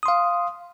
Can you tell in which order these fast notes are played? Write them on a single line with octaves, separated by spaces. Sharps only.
D#6 C6 F5